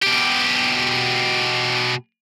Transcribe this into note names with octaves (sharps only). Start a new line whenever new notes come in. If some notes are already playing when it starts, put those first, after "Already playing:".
B2 G4